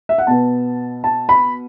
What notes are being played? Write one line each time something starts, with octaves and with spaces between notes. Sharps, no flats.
E5
F#5
B2 B3 A5
A5
B5